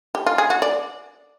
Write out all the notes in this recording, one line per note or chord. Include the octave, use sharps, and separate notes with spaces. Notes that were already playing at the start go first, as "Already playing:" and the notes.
G4
F4
G#4
F#4
D5